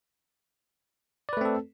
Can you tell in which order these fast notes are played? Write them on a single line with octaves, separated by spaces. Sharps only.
D5 B4 A3 C4 A4